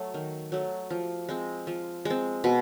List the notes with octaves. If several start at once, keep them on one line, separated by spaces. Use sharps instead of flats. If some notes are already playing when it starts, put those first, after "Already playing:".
Already playing: F#3 A3
D#3
F#3 A3
F3
G#3 C4
F3
G#3 C4
B2